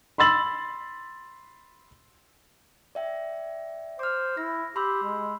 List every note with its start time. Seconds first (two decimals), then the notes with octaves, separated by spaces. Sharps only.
0.18 B5 C6 E6 A6 F#7
2.95 D5 E5 G5
3.99 C5 D6 F6
4.37 E4 A#6
4.76 G4 B5 C6 E6
5.02 G#3